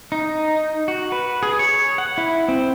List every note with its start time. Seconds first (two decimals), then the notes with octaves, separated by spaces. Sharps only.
0.12 D#4
0.88 F#4
1.12 B4
1.43 G#4
1.59 C#5
1.98 F#5
2.18 E4
2.48 C4